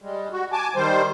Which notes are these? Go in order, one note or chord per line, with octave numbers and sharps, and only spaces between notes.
G3 G#3
F#4
G#5 A5 D6
D#3 G3 C5